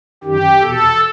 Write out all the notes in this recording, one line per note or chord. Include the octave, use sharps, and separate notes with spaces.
F#2 D#3 G4
E2 B2 A4